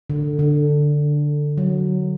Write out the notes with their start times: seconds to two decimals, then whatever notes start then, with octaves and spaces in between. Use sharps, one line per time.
0.10 D3
0.39 D3
1.57 F#3